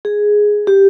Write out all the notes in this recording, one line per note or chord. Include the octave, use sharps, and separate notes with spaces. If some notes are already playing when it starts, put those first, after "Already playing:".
G#4
G4